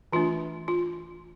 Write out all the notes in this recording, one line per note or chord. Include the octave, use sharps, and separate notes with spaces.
E3 A3 D4 F4
F4